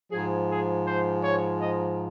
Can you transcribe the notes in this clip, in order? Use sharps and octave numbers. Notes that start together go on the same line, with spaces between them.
G#2 F3 G#4
G#4
C5
C#5
D#5